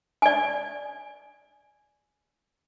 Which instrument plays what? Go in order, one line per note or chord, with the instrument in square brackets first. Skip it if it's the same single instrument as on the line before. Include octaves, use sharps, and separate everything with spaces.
[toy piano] D5 G#5